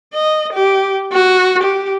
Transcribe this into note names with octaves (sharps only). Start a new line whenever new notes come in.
D#5
G4
F#4
G4